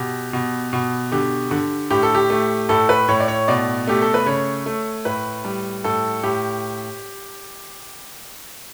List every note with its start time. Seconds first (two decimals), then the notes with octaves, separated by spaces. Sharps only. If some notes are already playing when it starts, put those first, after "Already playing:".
Already playing: B2 G4
0.33 B2
0.73 B2
1.12 D3 G4
1.51 D3
1.90 A2 G4
2.03 A4
2.15 G4
2.30 A3
2.69 A2 A4
2.89 B4
3.08 A2 C#5
3.20 D5
3.28 C#5
3.48 B2 D5
3.87 A3 G4
4.02 A4
4.14 B4
4.26 C#3 C#5
4.66 A3
5.05 A2 B4
5.44 G3
5.84 A2 A4
6.23 A2 G4